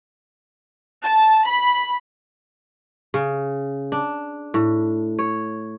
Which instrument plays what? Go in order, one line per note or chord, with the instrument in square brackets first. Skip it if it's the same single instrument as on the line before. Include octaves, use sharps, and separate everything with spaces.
[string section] A5
B5
[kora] C#3
D4
A2
C#5